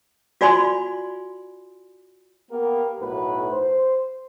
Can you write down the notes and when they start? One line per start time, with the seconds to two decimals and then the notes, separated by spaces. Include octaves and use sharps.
0.41 F4 F#4 D5 G#5 B5 C6
2.52 A#3 B3 G4 A#4
3.01 B1 A2 F#3 B4
3.50 C5